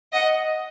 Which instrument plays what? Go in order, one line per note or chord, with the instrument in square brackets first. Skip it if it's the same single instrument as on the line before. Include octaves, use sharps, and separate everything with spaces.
[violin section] D#5 F#5